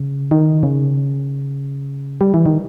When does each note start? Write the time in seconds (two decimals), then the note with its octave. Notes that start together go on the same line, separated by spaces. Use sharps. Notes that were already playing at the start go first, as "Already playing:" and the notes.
Already playing: C#3
0.31 D#3
0.63 C#3
2.21 G3
2.34 E3
2.46 D#3